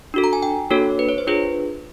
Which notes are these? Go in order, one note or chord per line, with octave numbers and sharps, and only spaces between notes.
D4 F#4 A4
A#5
G#5
G5
A#3 D4 F#4 A4 C#5
B4
C#5
C5
D4 F4 G#4 B4